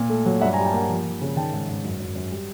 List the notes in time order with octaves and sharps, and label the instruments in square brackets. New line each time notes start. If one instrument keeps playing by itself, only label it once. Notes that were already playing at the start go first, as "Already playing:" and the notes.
Already playing: [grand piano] A#2
A3
F#3
G2 E5 F#5
G#5 A#5
G3
G5 A5
A#3 F#5 G#5
F3
F3
C#3
D#3 G5 A5
G#2
G#2
F#2
F#2
F#2
G3